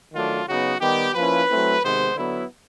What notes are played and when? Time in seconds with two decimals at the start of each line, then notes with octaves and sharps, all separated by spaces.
0.13 D#3 F#3 A3 D4 F4
0.47 C#3 F#3 B3 D#4 F#4
0.81 D#3 G3 B3 G4
1.15 F3 A#3 C#4 E4 B4
1.48 F#3 A3 C4 E4
1.83 C3 D#3 G#3 B3 C5
2.16 D3 F#3 B3 E4